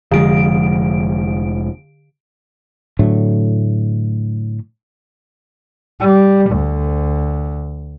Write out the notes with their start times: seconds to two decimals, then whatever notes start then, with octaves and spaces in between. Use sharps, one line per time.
0.11 F1 D3 F3 G#3 D7
2.99 A2 D3 F#3 A3
6.00 G3
6.51 D2